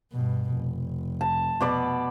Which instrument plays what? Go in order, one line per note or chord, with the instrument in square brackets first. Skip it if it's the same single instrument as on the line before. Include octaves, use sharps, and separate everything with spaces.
[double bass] G2 B2
F1
[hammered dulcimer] A5
B2 D5 B5